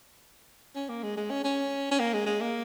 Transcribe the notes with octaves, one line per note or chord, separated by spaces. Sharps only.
C#4
A#3
G#3
G#3
C#4
C#4
C#4
A#3
G#3
G#3
A#3